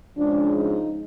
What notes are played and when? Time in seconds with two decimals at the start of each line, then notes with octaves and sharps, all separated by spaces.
0.16 C#3 F3 G#3 D4
0.55 D#4